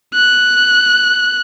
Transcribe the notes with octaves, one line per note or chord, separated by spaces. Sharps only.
F#6